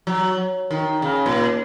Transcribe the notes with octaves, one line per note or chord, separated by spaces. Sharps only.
F#3
D#3
C#3
A#2